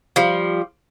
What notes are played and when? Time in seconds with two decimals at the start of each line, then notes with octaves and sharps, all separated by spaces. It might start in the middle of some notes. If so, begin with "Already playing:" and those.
0.16 F3 G3